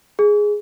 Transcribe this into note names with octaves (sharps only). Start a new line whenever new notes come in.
G#4